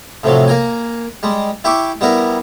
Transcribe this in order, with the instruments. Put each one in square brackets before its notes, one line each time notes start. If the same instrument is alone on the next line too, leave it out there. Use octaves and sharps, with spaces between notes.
[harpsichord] A2 C3 F3 F#3
A#3 A#4 G#5
G3 G#3
E4 G4 E5 G5 C#6 D6
G3 B3 E4 A#4